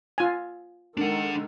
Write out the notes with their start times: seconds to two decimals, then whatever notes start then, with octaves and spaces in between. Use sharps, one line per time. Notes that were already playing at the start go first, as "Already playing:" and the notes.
0.18 F4 G#5
0.97 D#3 G#3 D4 A4 F#5